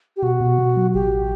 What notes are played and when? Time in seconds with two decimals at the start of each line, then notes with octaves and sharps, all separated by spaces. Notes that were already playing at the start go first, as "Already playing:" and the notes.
0.17 G4
0.23 B2 F#4
0.41 B2
0.58 B2
0.77 F#3
0.94 A1 G4